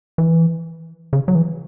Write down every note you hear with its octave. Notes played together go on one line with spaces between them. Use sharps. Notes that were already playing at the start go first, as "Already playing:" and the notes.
E3
C#3
F#3
E3